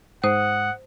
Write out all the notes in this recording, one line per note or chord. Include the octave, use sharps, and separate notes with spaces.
G#2 C5 F#5 D#6